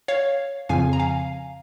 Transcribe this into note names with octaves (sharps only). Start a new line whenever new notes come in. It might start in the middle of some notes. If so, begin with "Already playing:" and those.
C#5 F5
F2 C#3 F3 F5 G#5
A#5
F5 G#5